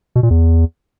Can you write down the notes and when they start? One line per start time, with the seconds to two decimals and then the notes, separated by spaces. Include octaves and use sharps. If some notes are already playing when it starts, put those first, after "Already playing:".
0.16 B2
0.23 A#2
0.30 E2